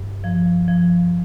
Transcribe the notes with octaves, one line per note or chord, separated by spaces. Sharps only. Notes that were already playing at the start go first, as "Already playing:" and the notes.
Already playing: G2
F3
F3